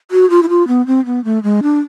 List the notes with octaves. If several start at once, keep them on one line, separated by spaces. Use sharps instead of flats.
F#4
F4
E4
F4
B3
C4
B3
A3
G#3
D4